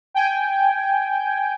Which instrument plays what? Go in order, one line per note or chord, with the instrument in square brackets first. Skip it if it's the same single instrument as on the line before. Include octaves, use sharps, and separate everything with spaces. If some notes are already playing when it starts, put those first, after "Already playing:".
[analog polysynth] G5 G#5